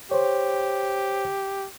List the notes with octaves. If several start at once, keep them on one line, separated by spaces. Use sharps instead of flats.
G4 C5 C#5